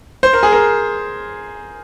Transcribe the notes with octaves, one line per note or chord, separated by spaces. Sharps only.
C5
A#4
G#4
A#4